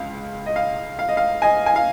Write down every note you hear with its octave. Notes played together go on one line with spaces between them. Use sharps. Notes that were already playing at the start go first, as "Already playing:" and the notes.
Already playing: C#2 F5
D#5
F5
F5
D#5
F5
D#5 G#5
G#5
F5